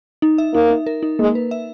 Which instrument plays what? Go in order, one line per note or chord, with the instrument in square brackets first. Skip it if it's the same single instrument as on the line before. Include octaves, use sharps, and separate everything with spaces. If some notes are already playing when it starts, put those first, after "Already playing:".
[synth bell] D#4
E5
[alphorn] A#3 [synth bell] D#4
[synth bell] D#4
A#4
D#4
[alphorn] G#3 [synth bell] A#3
[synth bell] B4
E5